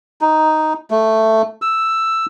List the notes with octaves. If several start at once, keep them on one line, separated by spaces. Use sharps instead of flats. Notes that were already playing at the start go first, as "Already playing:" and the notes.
D#4
A3
E6